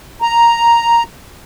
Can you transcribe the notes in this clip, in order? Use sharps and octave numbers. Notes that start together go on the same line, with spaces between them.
A#5